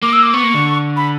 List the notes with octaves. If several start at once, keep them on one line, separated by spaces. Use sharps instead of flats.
A#3 D6
E6
D6
B3 C#6
A#3
D3
B5